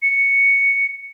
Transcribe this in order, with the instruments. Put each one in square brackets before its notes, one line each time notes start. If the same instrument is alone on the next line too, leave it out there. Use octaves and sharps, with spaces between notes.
[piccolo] C#7